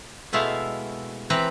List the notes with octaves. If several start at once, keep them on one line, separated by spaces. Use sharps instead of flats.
B2 G#3 A3 E4 F5
E3 C4 B4 A#5